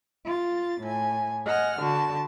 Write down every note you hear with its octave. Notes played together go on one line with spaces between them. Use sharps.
F4 A6
A2 G#5
D#5 F#5 G#5 F6
D3 F#4 A5